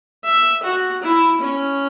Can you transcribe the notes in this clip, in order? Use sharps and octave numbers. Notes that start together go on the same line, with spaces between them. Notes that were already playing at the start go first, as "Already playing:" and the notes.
E5
F#4
E4
C#4